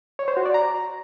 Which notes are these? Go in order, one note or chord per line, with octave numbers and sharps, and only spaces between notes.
C#5
C5
F#4
D5
A#5